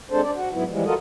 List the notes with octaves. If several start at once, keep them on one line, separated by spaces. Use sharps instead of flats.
G#3 C4 D4 A4 C5
D4 D5
F#4
D2 G#2 F#3 B3 E4
E3 F3 G3 G#3
F4 F#4 A4 A#4 D#5